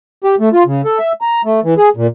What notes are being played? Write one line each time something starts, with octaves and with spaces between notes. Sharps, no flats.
G4
A3
F4
C#3
A4
E5
A#5
A3
E3
G#4
A#2